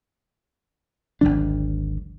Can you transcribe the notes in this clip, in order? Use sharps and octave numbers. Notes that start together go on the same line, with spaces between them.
G#1 D2 F#3 D4